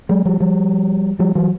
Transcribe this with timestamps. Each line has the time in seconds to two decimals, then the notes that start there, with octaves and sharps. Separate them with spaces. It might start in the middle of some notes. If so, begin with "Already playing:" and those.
0.09 F#3 G#3
0.25 F3 G3
0.40 F3 G3
1.19 F3 G3
1.35 E3 F#3